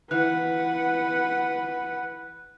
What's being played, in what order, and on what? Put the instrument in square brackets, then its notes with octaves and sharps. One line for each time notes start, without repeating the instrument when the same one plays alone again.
[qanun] E3 F5 [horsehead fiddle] B4 F#5 [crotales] F#6